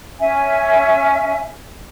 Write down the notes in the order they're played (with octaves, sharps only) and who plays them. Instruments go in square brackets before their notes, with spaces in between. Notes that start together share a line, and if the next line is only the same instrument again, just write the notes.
[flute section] C#4 E5 G#5